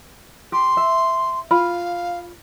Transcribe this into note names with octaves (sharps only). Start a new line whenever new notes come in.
G4 C6
E5
F4 F5 B5